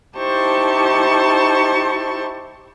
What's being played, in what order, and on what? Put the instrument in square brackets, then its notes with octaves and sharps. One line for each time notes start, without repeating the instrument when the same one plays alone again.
[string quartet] D#4 E4 G4 C5 A5 C#6